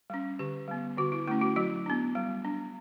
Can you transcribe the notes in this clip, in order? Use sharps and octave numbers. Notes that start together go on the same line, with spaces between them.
G3 C#4
D3 G4
G3 B3
D3 F#4
E4
A3 C#4 E4
F#4
F#3 F#4
B3 D4
G3
D4